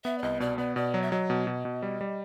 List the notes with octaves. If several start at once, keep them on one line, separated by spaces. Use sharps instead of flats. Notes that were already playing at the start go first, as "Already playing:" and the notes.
B3 E5
D5
C2 D#5
B2 D5
B3 D5
B2 D5
F#3
E5
F#3 D#5
B2
B2
B2
G3
G3